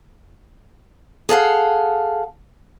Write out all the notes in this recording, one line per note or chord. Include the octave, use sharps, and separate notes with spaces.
G#4 A4 F5 F#5